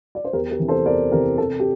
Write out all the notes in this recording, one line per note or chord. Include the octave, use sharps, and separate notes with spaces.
D5
C5
E2 G4 A#4
G4 A#4
C3 E3
A4 C5
E2 A#4 D5
C3 E3 G4 A#4
C3 A4
G4